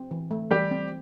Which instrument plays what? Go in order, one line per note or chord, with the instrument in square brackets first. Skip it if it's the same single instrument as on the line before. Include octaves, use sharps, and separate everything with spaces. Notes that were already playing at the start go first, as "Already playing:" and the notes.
Already playing: [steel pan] C4
E3
A3
[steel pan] E3 [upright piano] G3 G4
[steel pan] C4